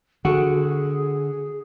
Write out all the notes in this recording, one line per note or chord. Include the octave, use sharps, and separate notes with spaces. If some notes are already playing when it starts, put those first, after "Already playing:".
D3 F#4 G#4 A4 F#5